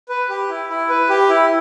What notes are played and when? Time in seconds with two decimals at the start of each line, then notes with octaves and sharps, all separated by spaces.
0.09 B4
0.29 G4
0.49 E4
0.69 E4
0.89 B4
1.10 G4
1.29 E4